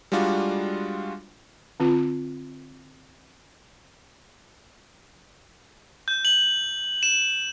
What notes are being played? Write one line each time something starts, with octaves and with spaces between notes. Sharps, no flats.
G3 G#3 D4 F4 F#4
D3 C4 F4
G6
F#7
E7